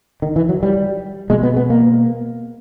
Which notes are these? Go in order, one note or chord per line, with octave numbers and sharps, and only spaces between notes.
D#3
E3
F#3
G3
B2 G#3
B3
B3
A#3